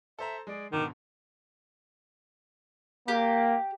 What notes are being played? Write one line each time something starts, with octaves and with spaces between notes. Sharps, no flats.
A4 C5 E5 A#5
G#3 G#4 D5
G#2 B2 D3 D#3 D6
A#3 G4